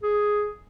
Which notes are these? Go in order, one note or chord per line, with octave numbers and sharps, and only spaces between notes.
G#4